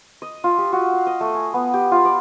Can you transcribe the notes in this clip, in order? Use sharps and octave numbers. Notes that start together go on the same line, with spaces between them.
D#5
F4
G4
F#4
F5
D#5
A3
G#5
B3
G4
F4
D5